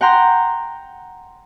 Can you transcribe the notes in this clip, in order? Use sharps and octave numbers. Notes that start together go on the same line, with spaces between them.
F#5 G5 A#5 C6 G6